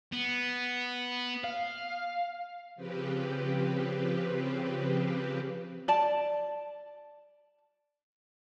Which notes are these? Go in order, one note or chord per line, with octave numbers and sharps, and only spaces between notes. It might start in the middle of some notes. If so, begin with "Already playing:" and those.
B3
F5
C#3 F3 C4 G4 B4
D5 A5